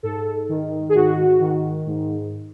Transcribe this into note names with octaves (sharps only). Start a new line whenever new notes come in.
G#2 A4
D#3
G#4
G#2 F#4
D#3
G#2